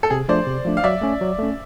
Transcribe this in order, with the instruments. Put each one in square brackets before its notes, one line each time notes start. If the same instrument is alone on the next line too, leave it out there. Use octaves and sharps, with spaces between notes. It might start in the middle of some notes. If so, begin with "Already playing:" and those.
[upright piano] A4
[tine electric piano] C3 [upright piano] G#4
[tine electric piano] F3 A3 D4 [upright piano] C5 D5
[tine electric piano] C3
F3 A3 D4
[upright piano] F5
[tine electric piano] F#3 [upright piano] D5 E5
[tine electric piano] A3 C#4
F#3
A3 C#4